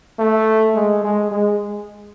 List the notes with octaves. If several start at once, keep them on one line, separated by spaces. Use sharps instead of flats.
A3
G#3
G#3
G#3